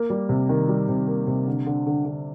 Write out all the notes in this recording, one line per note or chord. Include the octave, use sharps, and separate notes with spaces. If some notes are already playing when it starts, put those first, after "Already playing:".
Already playing: A#3
G3
C3
D#3
G3
C3
A#3
C3
D3
D3
D3
D3